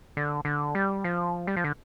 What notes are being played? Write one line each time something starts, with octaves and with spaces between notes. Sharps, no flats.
D3
D3
G3
F3
G3
F3
D3